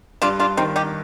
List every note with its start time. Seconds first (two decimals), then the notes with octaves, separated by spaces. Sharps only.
0.22 G2 D4 F4
0.39 D4 F4
0.57 D#3 C4 D#4
0.76 D#4 G4